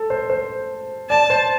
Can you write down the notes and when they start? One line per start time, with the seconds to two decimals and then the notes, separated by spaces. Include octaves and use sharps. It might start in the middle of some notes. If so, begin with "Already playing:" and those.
Already playing: A4
0.10 C5
0.30 C5
1.10 D5 A5
1.30 C5